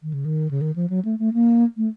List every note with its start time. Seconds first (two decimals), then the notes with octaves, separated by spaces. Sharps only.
0.03 D#3
0.14 C#3
0.25 D#3
0.51 C#3
0.61 D#3
0.76 F3
0.90 F#3
1.05 A3
1.19 A3
1.34 A#3
1.77 A3